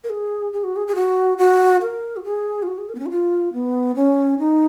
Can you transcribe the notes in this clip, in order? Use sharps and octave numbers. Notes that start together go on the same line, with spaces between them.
A#4
G#4
G#4
F#4
G#4
G#4
F#4
F#4
A#4
F#4
G#4
F4
F#4
G#4
A#4
B3
C#4
F#4
F4
B3
C#4
D#4